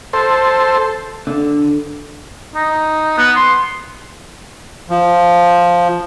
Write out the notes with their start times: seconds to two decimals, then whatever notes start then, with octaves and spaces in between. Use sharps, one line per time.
0.13 A4 C5
1.27 D3
2.55 D#4
3.18 B3
3.36 C6
4.90 F3